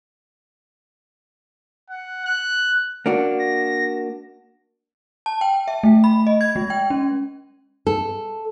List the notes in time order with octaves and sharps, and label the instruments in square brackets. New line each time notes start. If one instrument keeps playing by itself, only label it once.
[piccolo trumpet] F#5
F#6
[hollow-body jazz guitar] A#3 D4 F#4
[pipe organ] A#6
[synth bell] A5
G5
E5
A3
B5
D#5
G#6
G#3
G5
C#4
[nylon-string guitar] A4